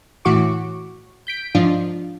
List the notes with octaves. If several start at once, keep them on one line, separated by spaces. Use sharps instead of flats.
A2 E3 F#4 C#6 D6
G6 B6 D7
G#2 F3 D4 F4